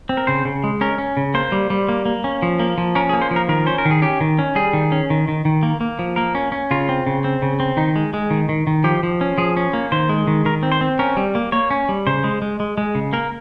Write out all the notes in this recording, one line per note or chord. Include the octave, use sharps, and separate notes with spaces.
C4
A#4
C#3 C5
C#3
G#3
C#4 A#4
C#4
C#3
A#3 C5
G3
G3
A#3
A#3
C#4
F3
A#3
F3
C#4 A#4
G#4
A#3
C5
F3
A#4
D#3 A#4
C#4 C5
A#4
D#3
G#4
C#4 G4
D#3
C#4
G3 G#4
D#3
C#4
D#3
D#3
D#3
A#3
A#3
F3
A#3 A#4
C#4
C#4
C#3 F4
C4
C#3
C4
C#3
C4
D#3 D#4
G#3
G#3
D#3
D#3
D#3
F3 G4
F3
C#4
F3 G#4
C#4
A#3
D#3 C5
G#3
D#3
D#3 A#4
C4
C5
C4
C#4 A#4
G3
A#3
A#3 C#5
C#4
G3
C#3 C5
G#3
G#3
G#3
G#3
C#3
A#3 A#4